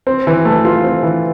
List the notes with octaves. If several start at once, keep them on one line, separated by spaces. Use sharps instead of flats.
C4
E3
A3
F4
C4
E3